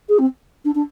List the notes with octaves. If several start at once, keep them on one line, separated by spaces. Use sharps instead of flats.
G#4
C4
D4
D4